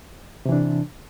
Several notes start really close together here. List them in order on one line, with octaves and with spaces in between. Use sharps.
C3 E3 D4